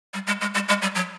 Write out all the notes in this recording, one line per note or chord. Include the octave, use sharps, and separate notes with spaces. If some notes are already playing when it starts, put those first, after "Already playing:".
G3
G#3
G#3
G#3
G#3
G3
F#3